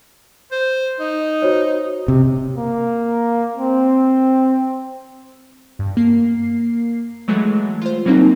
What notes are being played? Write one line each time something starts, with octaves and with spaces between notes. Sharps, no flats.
C5
D#4
F#4 C5 C#5
C3
A#3
C4
G2
A#3 C7
E3 F#3 G#3 A3
F4 C5
E3 F#3 G3 A#3 C4 D#4